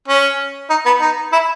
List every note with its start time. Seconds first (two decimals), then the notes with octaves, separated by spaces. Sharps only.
0.08 C#4
0.70 D#4
0.86 B3
1.01 D#4
1.33 E4